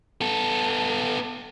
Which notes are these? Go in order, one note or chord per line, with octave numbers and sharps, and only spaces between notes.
B3 A4